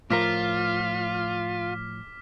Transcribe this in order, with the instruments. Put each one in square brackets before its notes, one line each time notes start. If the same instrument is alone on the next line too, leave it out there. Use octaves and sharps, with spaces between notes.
[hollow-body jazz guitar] A2 F3 A#4 [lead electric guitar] F4 [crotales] D6 F6 B6